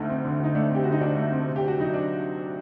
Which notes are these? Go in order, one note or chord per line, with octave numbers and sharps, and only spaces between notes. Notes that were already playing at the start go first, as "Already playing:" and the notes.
Already playing: D2 D3 A3 D#4
C4
D3
D2 D#4
A3 D4
C4 G4
D3 F#4
D#4
D2 D4
A3
C4
C3
G4
D2
F#4
F#3 D#4
D4